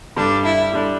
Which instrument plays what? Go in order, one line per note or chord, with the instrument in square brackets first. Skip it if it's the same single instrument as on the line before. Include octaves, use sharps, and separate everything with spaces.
[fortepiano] G2 D3 G3 [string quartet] D4
[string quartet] E4
[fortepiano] D3 G3 D4